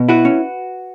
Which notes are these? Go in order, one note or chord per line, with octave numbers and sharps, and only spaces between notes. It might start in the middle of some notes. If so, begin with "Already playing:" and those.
Already playing: B2
E4 F#4 B4
C#4